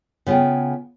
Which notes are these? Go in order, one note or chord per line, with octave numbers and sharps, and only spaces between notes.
C#3 B3 F4 G#4 G5